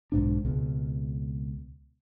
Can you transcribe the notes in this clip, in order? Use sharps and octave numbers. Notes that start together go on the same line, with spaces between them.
B1 G#2 D4
C#2 B2